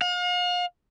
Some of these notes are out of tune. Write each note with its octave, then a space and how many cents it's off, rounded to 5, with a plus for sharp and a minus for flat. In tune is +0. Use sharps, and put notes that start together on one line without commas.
F5 +40